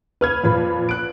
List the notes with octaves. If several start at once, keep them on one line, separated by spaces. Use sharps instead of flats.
B4 F6 G#6
F2 A#2 B4 B5
F#6 D7